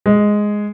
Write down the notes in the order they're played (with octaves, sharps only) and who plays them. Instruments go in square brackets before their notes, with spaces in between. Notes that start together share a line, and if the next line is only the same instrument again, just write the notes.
[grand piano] G#3